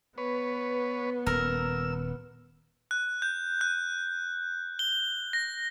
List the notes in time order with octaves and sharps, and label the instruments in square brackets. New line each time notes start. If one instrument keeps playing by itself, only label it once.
[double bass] B3 [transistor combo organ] B4 C#5
[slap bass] D#1 [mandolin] A#4 [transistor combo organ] E6
[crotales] F#6
G6
F#6
G7
A#6